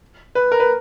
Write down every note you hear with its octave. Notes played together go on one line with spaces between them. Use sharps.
B4
A#4
B4